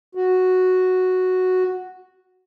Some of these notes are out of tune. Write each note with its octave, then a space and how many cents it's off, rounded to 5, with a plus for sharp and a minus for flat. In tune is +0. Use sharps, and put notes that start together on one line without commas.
F#4 -5